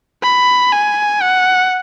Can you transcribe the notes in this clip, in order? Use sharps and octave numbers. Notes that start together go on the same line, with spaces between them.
B5
G#5
F#5